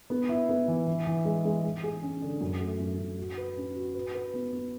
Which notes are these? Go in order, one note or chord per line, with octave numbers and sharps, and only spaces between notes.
B3
E4
B3
E3
E3
E3
G#3
G#3
G#3
G#4
C#4
D3
F#2
A3
F#2
F#2
F#4
B4
C#4
F#4
B4
B4
B3
B3